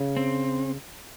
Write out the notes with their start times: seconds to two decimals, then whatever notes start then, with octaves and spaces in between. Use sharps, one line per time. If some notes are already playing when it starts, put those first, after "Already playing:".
Already playing: C#3
0.17 C4